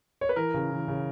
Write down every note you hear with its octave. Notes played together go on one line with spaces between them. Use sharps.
C#5
B4
E3 A#4
C#3
E3
C#3